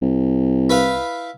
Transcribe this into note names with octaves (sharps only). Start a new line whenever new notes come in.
C2
E4 B4 F5